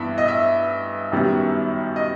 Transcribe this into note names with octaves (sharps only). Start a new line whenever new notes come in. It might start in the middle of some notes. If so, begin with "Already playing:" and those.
Already playing: G2 E3 B3 E5
D#5
E5
F#2 D#3 G3 B3
D#5